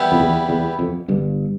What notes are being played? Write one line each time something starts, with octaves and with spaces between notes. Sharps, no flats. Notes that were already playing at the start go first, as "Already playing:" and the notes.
Already playing: E3 G3 B3 E4 G4
F2
E2
E2
F2
G1 G2